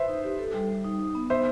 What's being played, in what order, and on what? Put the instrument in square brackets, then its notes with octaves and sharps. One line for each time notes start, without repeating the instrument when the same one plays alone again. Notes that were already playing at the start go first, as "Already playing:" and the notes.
Already playing: [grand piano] B4 C5 E5
[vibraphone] D#4
G4
A4
G3
G3
D#4
D#4
B3
[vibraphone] B3 [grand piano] C5 E5